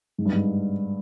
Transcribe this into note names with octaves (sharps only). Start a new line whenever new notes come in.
G#2
G2
G#2